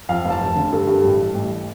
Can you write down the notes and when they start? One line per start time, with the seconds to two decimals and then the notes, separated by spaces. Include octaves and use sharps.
0.09 F2 F5
0.25 F1
0.30 A5
0.41 F1
0.56 D3
0.72 G2 A4
0.87 G2
1.04 A1
1.20 G3
1.35 A1